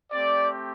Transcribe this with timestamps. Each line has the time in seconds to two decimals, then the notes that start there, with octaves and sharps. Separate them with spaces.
0.12 A3 C4 G4 D5